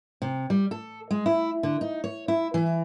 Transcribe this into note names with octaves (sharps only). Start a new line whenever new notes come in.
C3
G3
A4
G#3
E4
D3
D#4
C#5
E4
E3